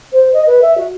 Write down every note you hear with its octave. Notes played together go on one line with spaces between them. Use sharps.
C5
D#5
B4
E5
F#4